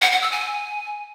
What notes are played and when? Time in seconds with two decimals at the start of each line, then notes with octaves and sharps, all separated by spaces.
0.02 F#5
0.12 F#5
0.22 E6
0.32 G#5